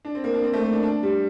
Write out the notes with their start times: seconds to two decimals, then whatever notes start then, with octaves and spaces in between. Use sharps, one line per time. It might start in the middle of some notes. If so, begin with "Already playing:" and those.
0.05 D4
0.15 C4
0.24 A#3
0.34 D4
0.44 C4
0.54 A3
0.63 A#3
0.73 D4
0.83 D4
1.03 G3